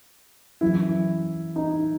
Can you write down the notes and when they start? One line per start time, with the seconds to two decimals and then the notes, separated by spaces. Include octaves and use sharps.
0.61 F#2 E3 E4
1.56 D#4